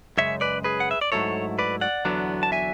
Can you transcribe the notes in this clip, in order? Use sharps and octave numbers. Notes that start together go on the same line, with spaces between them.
F#2 C#3 G#3 C#5 E5
B4 D5
G#4 B4
F#5
E5
D5
G#2 F#3 A3 E4 A4 C#5
B4 D5
D5 F#5
E2 D3 F#3 B3 D4
A5
E5 G#5